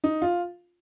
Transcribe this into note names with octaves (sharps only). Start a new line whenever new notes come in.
D#4
F4